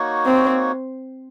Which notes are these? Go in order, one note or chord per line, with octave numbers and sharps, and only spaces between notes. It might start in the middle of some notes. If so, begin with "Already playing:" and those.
Already playing: A#3 D#4 F#4 C#5
C4